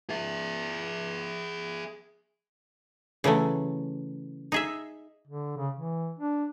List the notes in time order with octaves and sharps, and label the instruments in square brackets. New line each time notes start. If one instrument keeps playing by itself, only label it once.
[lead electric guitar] G#4 E5
[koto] C#3 E3 F#3 A3
D#4 G#4 E5
[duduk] D3
C#3
E3
D4